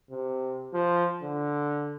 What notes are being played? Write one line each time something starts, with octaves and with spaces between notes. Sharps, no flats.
C3
F3
D3